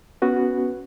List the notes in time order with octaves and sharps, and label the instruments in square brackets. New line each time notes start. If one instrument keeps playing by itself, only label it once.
[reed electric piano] B3 C#4 F#4 B4